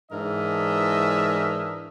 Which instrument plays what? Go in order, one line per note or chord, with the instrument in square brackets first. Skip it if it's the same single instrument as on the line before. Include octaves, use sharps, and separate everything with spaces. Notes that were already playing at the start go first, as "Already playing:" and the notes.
[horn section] G#2 E3 D4 A#4 D#5 E5